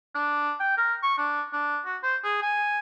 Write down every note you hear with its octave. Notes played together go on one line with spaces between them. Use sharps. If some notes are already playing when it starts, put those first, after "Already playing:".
D4
G5
A#4
C#6
D4
D4
F#4
C5
G#4
G#5